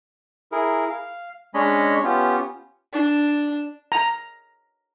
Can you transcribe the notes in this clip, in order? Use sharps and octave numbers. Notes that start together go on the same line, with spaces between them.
E4 G#4 A#4
F5
G#3 C#4 D4 C#5 D#5 B5
B3 C#4 F4 G4
D4
A#5